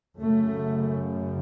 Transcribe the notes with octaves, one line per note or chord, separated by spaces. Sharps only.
F#2 C#3 A3